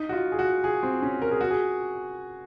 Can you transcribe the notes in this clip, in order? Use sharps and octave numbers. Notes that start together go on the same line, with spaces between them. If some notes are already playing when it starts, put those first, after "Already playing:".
Already playing: D#4
F#4
F4
G#4
F#4
G#4
C4
C#4
A#4
G#4
F#4
G#4